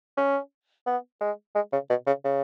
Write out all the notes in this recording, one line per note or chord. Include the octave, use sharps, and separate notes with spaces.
C#4
B3
G#3
G#3
C#3
B2
C#3
C#3